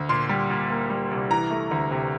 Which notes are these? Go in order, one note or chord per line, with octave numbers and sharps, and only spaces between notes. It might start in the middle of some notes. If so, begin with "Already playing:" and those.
Already playing: D2
A#2 C6
G3
A#2
A#3
G3
C2
E3 A#5
A3
D2
C3